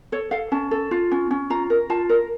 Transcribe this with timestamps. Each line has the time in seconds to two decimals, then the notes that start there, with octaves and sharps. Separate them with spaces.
0.12 A4 C#5
0.31 A4 F5
0.52 C#4 A5
0.71 A4
0.91 F4
1.11 C#4
1.31 C#4
1.50 F4 A#5
1.70 A#4
1.90 F4 A5
2.09 A#4